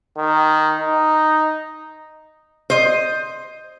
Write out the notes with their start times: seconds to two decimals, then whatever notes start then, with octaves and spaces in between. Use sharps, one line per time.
0.17 D#3
0.80 D#4
2.70 C5 D#5